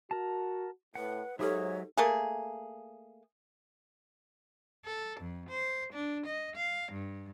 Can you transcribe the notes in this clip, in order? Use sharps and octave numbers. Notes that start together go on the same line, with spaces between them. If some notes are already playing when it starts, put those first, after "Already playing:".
F#4 A#4 A5
A2 B4 F#5
G#2 F#3 D#4 G4 A4 C#5 E5 D#6
A3 A#3 G#4
A4
F2
C5
D4
D#5
F5
G2